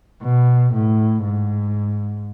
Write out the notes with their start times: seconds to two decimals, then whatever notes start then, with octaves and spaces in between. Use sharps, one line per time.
0.22 B2
0.74 A2
1.25 G#2